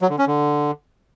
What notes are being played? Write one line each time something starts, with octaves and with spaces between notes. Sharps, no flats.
F#3
D3
C#4
D3